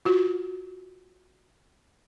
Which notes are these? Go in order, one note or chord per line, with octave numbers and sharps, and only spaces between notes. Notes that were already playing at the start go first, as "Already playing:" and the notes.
F4 F#4